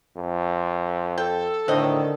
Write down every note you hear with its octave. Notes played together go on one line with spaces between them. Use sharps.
F2
A4 G5
A2 D3 D#3 C4 D#5